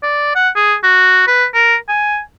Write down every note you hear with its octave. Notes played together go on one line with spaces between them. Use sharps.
D5
F#5
G#4
F#4
B4
A#4
G#5